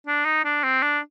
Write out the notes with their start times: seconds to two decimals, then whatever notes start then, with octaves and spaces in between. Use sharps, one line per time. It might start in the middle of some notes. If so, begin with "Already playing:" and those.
0.07 D4
0.25 D#4
0.44 D4
0.64 C4
0.82 D4